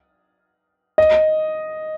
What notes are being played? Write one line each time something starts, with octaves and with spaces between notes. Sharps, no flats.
D#5